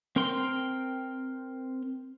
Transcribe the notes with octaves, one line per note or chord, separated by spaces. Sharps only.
C4 A#4 G5 C6